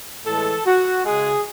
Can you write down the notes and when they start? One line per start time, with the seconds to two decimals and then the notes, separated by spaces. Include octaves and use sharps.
0.25 A2 E3 G#3 A4
0.66 F#4
1.05 C#3 G#3 G#4